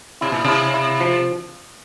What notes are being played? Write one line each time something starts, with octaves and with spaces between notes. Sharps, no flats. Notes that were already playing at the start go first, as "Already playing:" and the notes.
C3 E4
A#2
C3 E4
E4
F3